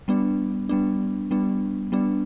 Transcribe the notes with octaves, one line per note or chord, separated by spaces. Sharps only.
G3 B3 D4
G3 B3 D4
G3 B3 D4
G3 B3 D4